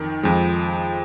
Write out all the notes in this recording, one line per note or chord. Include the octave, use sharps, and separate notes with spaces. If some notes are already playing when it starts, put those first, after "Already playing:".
Already playing: F2 D#3
F2 F3 G#3